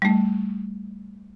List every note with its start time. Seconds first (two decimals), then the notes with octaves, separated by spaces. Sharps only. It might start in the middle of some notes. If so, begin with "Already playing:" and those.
0.02 G3 A3